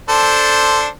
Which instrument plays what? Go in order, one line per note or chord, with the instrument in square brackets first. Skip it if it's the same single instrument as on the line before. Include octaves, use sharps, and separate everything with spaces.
[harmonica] D4 A4 C5